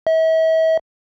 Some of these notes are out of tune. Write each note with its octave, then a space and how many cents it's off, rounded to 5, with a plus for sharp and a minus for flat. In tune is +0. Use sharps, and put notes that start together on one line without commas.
E5 -40